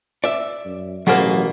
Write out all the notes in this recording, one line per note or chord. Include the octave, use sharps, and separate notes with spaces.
D5 E5
F#2
A1 B2 F#3 A#3 G#4 C5